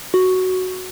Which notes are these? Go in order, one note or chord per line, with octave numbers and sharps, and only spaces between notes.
F#4